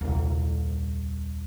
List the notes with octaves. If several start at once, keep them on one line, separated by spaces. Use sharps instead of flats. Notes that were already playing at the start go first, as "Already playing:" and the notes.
D#1 C2